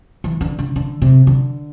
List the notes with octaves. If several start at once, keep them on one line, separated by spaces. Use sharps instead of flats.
E3
D3
D3
D3
C3
D3